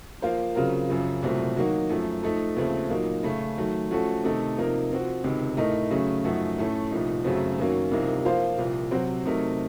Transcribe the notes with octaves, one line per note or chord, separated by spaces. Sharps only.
F3 A#3 F4 C5
C#3 F#3 C4 F4 A#4
F#2 C#3 F3
C2 A#2 F#3 A3 C4
D#3 F#3 A#3 D#4 F#4
F#2 F3 A3
F3 A3 D#4 A4
D#2 C#3 F3 A3 C4
A#2 F#3 A#3 D#4
C#3 A3 C#4
D#3 F#3 A3
F3 A3 C#4 F#4 A4
C3 D#3 A3 D#4 A4
C3 F3 A#3 D#4 A#4
F3 C4 F#4
C#2 C3 D#3
A2 A3 D#4 A#4 D#5
C#3 F#3 A3 C#4
F#2 F3 A3 D#4 F#4
A2 A3 C#4 A4
C2 A#2 F3 A3 D#4
F#2 C#3 F#3 A3 C4
F#2 D#3 F#3 A#3 C#4
C2 C3 F3 A#3 D#4
F3 A#3 F4 C5 F5
C2 A#2 F3
C3 F#3 C4 F#4 C5
C3 F#3 A3 D#4 A#4